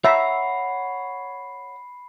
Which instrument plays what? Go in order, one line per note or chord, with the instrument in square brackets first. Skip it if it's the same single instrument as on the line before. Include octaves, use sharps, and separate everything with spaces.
[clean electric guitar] C#5 F#5 A#5 [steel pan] E5 [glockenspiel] B5 C7